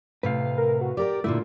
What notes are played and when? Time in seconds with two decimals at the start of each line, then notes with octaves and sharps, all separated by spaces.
0.23 A2 C3 B4 F5
0.57 A#4
0.81 F#4
0.97 G4 A#4 D5 G5
1.24 A#2 D3 A3 E4 F4